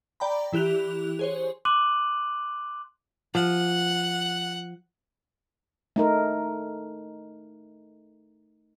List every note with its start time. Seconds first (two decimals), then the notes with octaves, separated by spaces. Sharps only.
0.20 D5 G5 A#5 B5
0.53 E3 E4 G4 F#6 F7
1.19 G#4 C5 C#5
1.65 C6 D6 F#6 D#7 F#7
3.35 F3 F#5
5.96 A3 D#4 A#4